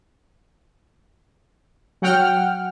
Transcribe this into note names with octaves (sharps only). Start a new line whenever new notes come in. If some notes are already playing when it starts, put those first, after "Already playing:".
F#3 F#5 G5 F6